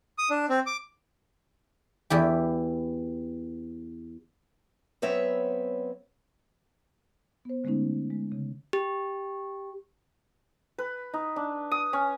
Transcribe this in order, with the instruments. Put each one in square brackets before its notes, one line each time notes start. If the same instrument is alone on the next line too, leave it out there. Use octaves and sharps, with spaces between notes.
[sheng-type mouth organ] D#6
D4
C4
D6
[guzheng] E2 E4 G4
[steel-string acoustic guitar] F#3 B3 C4 B4 C#5 E5
[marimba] B3 C5
D3 G#3 A3 B3 C#4 D#4
G#3
C#3
[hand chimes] G4
[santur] B4
D#4
D4
D#6
C#4